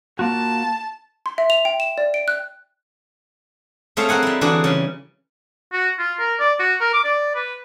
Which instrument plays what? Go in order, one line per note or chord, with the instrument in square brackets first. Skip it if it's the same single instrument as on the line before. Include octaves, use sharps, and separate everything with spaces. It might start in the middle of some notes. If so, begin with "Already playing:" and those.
[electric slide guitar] A#3 F4 F#4 [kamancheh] A5
[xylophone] C6
E5
F7
G5
E7
D5
D7
F#6
[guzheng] A3 C4 G#4 C#5 E5 F5
C4 A#4 F#5 G#5
G3 E4
D3 E3 C4 D4 F#4 G#4
C#3 G3
[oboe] F#4
F4
A#4
D5
F#4
A#4
D6
D5
B4